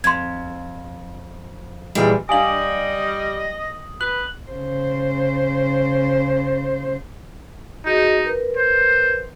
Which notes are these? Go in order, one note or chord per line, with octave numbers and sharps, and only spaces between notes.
F2 C6 G#6
A#2 E3 G3 G#3
G3 D4 D#5 F5 G#5 D#6 F#7
B4 F#6 F#7
C#3 C5
D#4 F#4 G#4 D#5
A#4 B4
C5